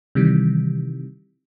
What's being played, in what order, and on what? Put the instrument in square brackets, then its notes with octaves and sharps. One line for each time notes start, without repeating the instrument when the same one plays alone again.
[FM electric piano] C3 D#3 E3 G3